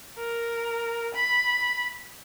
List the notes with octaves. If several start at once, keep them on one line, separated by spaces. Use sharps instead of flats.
A#4
B5